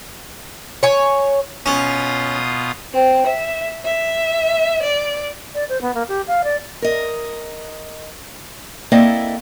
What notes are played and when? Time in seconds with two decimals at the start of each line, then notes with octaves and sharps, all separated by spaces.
0.83 C#5 G#5
1.66 B2 C#4 F4 D#6
2.92 C4
3.26 E5
3.84 E5
4.82 D5
5.54 D5
5.69 C5
5.81 B3
5.94 A#3
6.08 G4
6.27 F5
6.44 D5
6.82 A#4 D#5
8.92 A#3 C4 E4 A4 D5 D#5